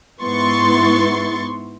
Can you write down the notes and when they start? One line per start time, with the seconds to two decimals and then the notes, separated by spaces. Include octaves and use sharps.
0.22 G#2 B3 E4 C6 C#6 A6